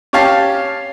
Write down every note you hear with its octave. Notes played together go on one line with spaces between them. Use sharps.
C#4 G4 C#5 F5 A5